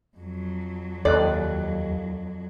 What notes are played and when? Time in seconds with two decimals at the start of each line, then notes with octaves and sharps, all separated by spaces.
0.17 F2 F#3
1.05 D#2 A4 D5 D#5 F#6